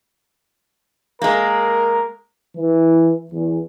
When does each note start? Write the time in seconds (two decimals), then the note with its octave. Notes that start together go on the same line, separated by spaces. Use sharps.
1.22 G#3 A#3 A#4
2.57 E3
3.32 E2